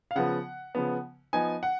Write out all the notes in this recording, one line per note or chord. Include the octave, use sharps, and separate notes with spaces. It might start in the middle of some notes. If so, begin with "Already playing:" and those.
F5
C#3 F3 B3 F#5
C#3 F3 B3
F3 B3 D#4 G#5
F#5